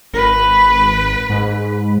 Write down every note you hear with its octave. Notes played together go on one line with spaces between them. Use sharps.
G#1 B4
G#2